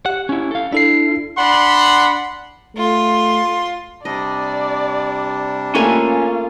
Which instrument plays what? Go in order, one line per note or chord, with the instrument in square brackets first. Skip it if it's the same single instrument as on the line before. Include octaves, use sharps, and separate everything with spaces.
[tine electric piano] G4 [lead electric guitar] F#5
[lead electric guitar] C#4 E4
A4 F5
[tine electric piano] D4 A4 C7 [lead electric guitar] E4
[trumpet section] D4 F#5 B5 C6
[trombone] A3 [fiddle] F4 C6
[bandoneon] C3 G3 D4 [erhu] D5 [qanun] D#5
[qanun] A3 A#3 A4 [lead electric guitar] C#4 G#5 [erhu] F4